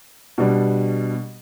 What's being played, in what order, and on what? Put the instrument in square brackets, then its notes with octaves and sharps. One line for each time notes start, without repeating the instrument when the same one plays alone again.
[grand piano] B2 G3 D4